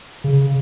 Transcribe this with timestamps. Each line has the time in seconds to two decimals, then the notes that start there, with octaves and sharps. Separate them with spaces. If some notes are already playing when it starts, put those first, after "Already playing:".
0.24 C#3